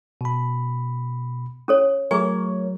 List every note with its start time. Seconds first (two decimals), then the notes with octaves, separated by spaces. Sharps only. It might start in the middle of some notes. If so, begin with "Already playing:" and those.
0.21 B2 B5
1.68 C#4 A4 C#5
2.11 F#3 A3 G#4 A#4 C#5 G#5